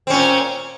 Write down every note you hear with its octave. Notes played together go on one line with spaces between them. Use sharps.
A#2 C4 C#4